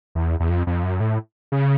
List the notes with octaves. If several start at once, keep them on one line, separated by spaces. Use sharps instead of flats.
E2
E2
F2
F2
F#2
A2
C#3